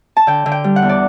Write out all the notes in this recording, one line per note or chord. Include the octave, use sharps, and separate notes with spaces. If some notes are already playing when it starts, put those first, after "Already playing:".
A5
D3 G5
D3
G5
G3
F#5
E2
D5